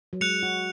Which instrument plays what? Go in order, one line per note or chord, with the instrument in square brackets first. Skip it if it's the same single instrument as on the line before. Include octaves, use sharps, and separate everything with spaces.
[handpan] F#3
[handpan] G#3 [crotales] F#6 C#7 F7
[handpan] F#4